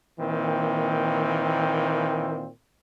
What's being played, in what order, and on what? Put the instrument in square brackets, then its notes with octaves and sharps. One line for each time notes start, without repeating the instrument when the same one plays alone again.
[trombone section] A#2 D#3 E3 A#3 C4